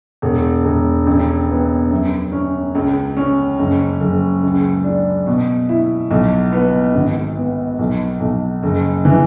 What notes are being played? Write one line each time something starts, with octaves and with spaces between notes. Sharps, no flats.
E1
E1
A1
B3
F#2
C#4
C#2
C#4
F#1
F#1
C#2
D4
B2
E4
B1
B3
G#1
B3
B1
B1
F#1
E3